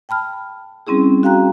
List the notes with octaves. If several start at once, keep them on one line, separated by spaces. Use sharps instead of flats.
G5 A5 B5 F6
G3 C4 C#4 E4 G#4
F#4 F5 G5 A#5 F#6